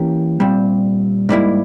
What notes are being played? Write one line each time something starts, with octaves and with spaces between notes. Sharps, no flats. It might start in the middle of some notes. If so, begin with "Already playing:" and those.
Already playing: E3 A#3 C#4 G4 A#4
A#2 G3 C4
G#2 G3 A#3 E4